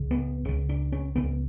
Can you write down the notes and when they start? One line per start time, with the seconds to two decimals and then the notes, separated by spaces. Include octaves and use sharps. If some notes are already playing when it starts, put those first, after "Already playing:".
Already playing: C#2 C#3
0.11 B3
0.45 C#2 C#3 C#4
0.69 D4
0.92 C#4
1.16 C#2 C#3 B3